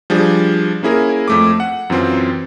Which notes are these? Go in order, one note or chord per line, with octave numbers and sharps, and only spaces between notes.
F3 G3 D4 G#4
A#3 C#4 E4 G#4 A#4
F2 A3 D6
F#5
F#2 E3 C4 F4